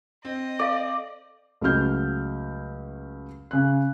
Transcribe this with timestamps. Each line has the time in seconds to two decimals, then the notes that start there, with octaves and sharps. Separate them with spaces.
0.25 C4 D#5
0.59 A4 D5 F5
1.61 C#2 F#3 A3 F6 G6
3.51 C#3 F#6